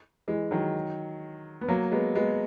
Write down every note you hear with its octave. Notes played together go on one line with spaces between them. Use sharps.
E3 G#3
D#3 F#3
B3
F#3 A#3
G#3 B3
G#3 B3